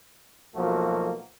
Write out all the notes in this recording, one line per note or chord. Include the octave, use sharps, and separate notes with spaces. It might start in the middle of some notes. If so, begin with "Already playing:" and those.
B1 F3 A3 A#3 F#4